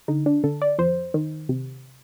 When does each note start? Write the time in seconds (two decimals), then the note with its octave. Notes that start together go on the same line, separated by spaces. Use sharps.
0.08 D3 D#4
0.26 D4
0.44 D3 A4
0.62 D5
0.79 F2 C5
1.14 D#3
1.49 C3